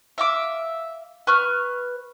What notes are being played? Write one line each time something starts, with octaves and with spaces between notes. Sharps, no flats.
E5 F5 D6
B4 C#6 F6